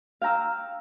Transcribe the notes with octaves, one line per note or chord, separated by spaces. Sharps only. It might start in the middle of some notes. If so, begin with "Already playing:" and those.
F5 G5 A#5 E6